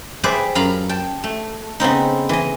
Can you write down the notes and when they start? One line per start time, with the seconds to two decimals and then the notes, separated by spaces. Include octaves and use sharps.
0.23 G4 G#4 B4 C5 D5 E5
0.55 F#2 F5 A#5 B5
0.89 G5 A5
1.24 A3
1.80 C#3 B3 C4 D#4
2.29 E3 D#5